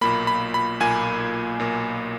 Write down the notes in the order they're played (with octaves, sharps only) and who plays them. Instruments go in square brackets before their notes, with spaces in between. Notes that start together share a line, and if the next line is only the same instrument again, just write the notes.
[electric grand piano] B1 A#2 A#3 B5
B5
B5
B1 A#2 A#3 G#5
B1 A#2 A#3